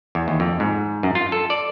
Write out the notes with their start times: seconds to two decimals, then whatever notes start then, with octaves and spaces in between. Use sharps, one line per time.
0.15 E2
0.28 D#2
0.40 F2
0.60 G#2
1.03 F#2
1.15 F4
1.32 A4
1.50 D5